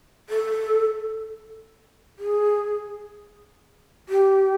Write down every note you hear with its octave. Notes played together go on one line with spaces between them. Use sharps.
A4
G#4
G4